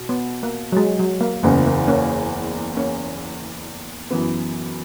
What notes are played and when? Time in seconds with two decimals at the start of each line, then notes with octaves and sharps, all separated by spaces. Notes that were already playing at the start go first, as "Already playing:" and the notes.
Already playing: B2
0.09 B3
0.43 A#3
0.72 F#3
0.77 G#3
0.99 F#3
1.21 A#3
1.43 F#1 E2 C#3 A#3
1.66 A#3
1.88 A#3 C#4
2.77 A#3 C#4
4.10 F#2 E3 B3